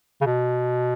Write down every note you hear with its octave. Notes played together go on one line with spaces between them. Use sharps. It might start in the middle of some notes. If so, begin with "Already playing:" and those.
C#3
B2